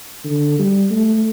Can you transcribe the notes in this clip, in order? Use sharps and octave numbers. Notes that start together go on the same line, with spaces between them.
D3
G3
A3